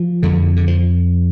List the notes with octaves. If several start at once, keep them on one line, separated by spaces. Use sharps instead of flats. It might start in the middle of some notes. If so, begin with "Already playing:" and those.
Already playing: F3
F2 D3
D3
F3